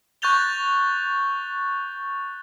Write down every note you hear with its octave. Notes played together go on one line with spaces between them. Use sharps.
C#6 F#6 G6 A6 F7 G7